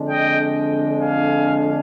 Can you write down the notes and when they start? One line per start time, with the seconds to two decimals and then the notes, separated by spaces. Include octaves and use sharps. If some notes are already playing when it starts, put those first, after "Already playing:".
Already playing: F2 D3 G#3 D4
0.08 D#5 G5
0.99 F5 G#5